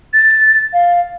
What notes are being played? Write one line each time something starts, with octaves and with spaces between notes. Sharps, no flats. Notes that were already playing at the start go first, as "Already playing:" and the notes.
A6
F5